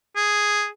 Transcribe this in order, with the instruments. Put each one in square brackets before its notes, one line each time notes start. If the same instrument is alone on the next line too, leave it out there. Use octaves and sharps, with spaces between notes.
[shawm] G#4